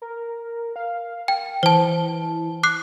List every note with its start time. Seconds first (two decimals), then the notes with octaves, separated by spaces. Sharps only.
0.02 A#4
0.76 F5
1.28 G5
1.63 E3 C5 A5
2.63 D6 F#6 C7